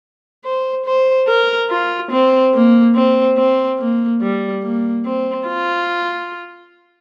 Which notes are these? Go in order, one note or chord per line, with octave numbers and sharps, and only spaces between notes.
C5
C5
A#4
F4
C4
A#3
C4
C4
A#3
G3
A#3
C4
F4